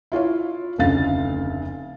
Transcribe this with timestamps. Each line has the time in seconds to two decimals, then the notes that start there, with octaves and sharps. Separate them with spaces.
0.12 E4 F4 C#5 F5
0.78 F1 D2 C#3 F5 A6